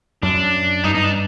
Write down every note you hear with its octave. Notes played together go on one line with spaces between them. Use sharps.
F#2 D4
G2 D#4
D#4
D4